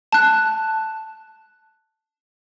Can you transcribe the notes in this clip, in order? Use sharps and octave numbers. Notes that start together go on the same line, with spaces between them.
A5 F#6